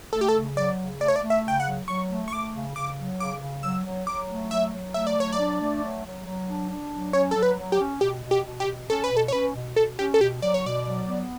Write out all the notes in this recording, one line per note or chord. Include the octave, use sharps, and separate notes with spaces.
A3 A4
G4
A4
C#3
F#3 D5
C#3
A3 D5
C#5
D5
A3
E5
C#3 G5
F#5
F#3
F#3 C#6
A3
C#6
A3 D6
C#3
C#3 D6
F#3
C#3 D6
C#3
F#3 E6
F#3
F#3 D6
A3
F#3 E5
F#3
A3 E5
D5
F#3 C#5
D5
D4
A3
F#3
F#3
F#3
D4
D4
F#3
C#4 C#5
F#3 A4
B4
F#3
G4
C#4
B2 G4
B2
G4
B2
G4
B2
C#4 A4
B4
B2
A4
C#5
C#4 B4
B2
B2 A4
C#4 G4
A4
B2 G4
F#3 D5
C#5
B2 D5
F#3
B3